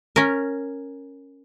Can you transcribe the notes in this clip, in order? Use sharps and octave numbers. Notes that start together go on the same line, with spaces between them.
C#4 A#4